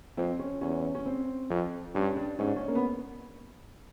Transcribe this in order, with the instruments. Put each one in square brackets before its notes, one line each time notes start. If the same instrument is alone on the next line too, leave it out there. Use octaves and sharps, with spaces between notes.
[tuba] F2 [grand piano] C4
[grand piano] C#4
[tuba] E2 [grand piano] C#4
[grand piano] C#4
C4
[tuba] F2
[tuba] G2 [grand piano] C#4
[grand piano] D4
[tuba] G#2 [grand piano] C#4
[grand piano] D4
C#4
A#3
B3